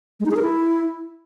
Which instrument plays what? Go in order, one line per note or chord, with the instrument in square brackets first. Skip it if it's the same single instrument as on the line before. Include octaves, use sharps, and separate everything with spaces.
[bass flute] G#3
D#4
G#4
A#4
E4